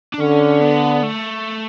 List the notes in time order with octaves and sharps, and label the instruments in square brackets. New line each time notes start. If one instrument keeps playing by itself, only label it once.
[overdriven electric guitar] D4
[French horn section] D3 [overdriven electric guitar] C#4
[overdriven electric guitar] B3
A3